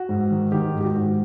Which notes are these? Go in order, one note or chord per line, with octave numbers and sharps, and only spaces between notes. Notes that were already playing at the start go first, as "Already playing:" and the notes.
Already playing: F#4
G#2
D#3
D#3 G4
G#2
G4
F#4
G#2